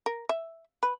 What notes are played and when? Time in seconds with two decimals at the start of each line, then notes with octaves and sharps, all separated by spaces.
0.06 A#4
0.29 E5
0.83 B4